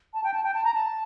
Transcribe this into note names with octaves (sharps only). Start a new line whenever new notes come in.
A5
G5
A5
G5
A5
A#5
A5